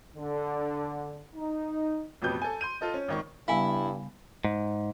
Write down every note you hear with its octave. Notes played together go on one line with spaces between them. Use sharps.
D3
D#4
A1 F2 B2 G4 B4 G6
A4 G#5
C6 G6 D#7
F4 A4 D#5
C#4
G#1 D#3 C#6
G2 C#3 G3 B3 E4 F5 G#5
G#2